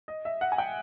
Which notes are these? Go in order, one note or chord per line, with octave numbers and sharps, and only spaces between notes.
D#5
E5
F#5
G#5
G5